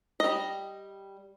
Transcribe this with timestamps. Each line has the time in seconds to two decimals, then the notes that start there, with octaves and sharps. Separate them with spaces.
0.20 G3 D#5